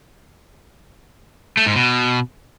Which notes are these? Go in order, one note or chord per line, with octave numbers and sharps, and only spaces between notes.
A3
G#2
B2